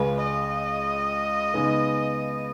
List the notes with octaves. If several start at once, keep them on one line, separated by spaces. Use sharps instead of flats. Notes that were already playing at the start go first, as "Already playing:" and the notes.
Already playing: C#2 C#3 G#3 B4
D#5
C#3 G#3 B3 D#4